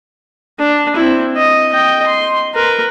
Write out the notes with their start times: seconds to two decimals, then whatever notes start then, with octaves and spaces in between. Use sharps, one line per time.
0.59 D4
0.96 C4 E4
1.37 D#5
1.73 D#5 G5
2.07 C6
2.55 A#4 B4